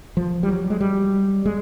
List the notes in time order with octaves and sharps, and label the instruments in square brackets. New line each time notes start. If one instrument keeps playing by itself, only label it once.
[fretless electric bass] F3
G3
F#3
G#3
G3
G#3